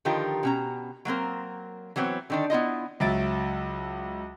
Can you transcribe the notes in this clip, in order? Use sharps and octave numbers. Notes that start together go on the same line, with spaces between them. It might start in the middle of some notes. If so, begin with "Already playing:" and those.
D3 D#3 F3 F4 G4 A#4
B2 C#4 A#5
F#3 A#3 C4 A#4
E3 F#3 B3 C4 C#5
D3 D#3 D4
B3 E4 F4 D#5
C#2 F#3 E5 A6 D7